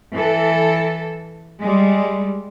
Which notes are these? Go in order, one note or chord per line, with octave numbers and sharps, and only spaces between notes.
E3 A4
G3 G#3